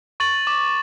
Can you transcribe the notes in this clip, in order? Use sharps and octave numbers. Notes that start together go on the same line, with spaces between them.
C#6 A6 F#7
D6